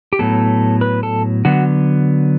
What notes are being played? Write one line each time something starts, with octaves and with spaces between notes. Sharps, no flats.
G4
A2 F#3 B3 A4
B4
A4
D3 F#3 B3 F#4